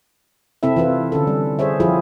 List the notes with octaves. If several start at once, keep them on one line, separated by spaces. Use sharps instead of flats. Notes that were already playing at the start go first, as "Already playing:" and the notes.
C3 C4 E4 A4 E5
E3 E4 F4 B4
D3 C#4 A4
G3
G#4 C5 C#5 E5
F3 E4 F4 G4 G#4